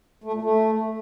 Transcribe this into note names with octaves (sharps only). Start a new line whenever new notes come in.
A3
A#2
A3